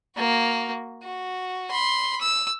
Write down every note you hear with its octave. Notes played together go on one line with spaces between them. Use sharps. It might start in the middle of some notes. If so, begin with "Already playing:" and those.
A#3 F#4
F#4
B5 C6
E6